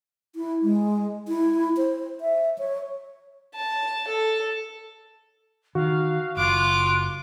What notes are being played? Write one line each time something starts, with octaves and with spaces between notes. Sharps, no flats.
E4
G#3
E4
C5
E5
C#5
A5
A4
D#3 F#4 F5
F#1 F4 D6 F#6